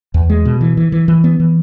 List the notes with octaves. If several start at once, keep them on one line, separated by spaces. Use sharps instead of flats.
E2
G#3
B2
E3
E3
E3
E3
B3
E3